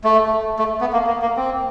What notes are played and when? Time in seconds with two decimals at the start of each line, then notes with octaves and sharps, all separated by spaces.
0.04 A3
0.59 A3
0.81 B3
0.93 A#3
1.07 A#3
1.22 A#3
1.37 C4